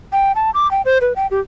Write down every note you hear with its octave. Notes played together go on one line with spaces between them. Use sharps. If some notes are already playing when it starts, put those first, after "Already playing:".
G5
A5
D6
G5
C5
B4
G5
G4